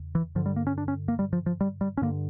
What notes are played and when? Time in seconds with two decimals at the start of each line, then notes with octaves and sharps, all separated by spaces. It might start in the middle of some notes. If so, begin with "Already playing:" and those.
Already playing: E2 C#3
0.15 E3
0.35 G2 D3 F3
0.46 G3
0.56 A#3
0.67 C#4
0.78 D4
0.88 C#4
1.08 A#3
1.19 G3
1.33 F3
1.46 F3
1.61 G3
1.81 G3
1.97 C#4
2.02 G2 D3 A#3